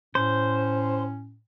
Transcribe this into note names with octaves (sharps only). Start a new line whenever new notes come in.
A2 C#4 C5